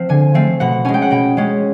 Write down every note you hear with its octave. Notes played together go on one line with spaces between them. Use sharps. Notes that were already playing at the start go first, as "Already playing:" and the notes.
Already playing: F3 C4
D3 G#5
F3 A3 C4
B2 F#5
G#3 C#4 G#5
G5
F#5
B2 G5
G#3 C#4